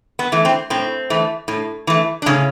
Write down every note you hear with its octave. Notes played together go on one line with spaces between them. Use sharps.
B3
E3 A3
C4
A2 C4
E3 A3
A2
E3 A3
D4
A2 C#3 C#4